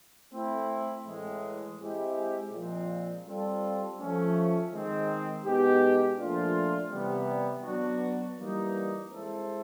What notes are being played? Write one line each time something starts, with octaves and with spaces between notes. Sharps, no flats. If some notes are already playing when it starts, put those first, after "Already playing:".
A3 C4 E4
A2 E3 G#3
G#3 C4 E4 G4
A#2 F3 G#3 C4
G3 C4 F4 A4
F3 A3 C#4
D#3 G#3 C4
B2 G#3 B3 D#4 G4
A#2 F3 A3 D4 F4
C3 E3 G3 B3
F#3 B3 D4 F#4
E3 G3 A#3 D#4
G#3 C4 E4 A4 C5